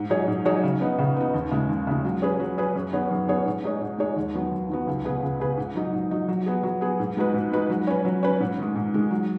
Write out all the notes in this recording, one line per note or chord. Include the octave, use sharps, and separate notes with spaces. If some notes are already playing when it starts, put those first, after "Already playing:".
Already playing: G#2
F#3 D#4 G#4 C#5
G#2
F#3 D#4 G#4 C#5
C#3
B3 D#4
C#3
B3 D#4
D#2
C#3 G#3
D#2
C#3 G#3
F#3
C#4 G#4 B4
F#3
C#4 G#4 B4
F#2
D#3 B3 G#4 C#5
F#2
D#3 B3 G#4 C#5
G#2
G#3 D#4 G#4 C#5
G#2
G#3 D#4 G#4 C#5
D#2
D#3 F#3 B3
D#2
D#3 F#3 B3
C#2
C#3 B3 G#4 B4
C#2
C#3 B3 G#4 B4
G#2
F#3 D#4
G#2
F#3 D#4
F#3
B3 G#4
F#3
B3 G#4
G#2
G#3 D#4 F#4 B4
G#2
G#3 D#4 F#4 B4
F#3
C#4 B4
F#3
C#4 B4
G#2
D#3 G#3
G#2
D#3 G#3
F#3